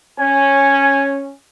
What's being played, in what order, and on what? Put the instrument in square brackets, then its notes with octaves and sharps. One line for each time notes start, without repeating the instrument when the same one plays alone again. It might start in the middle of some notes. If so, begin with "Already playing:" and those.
[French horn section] C#4 [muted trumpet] G#5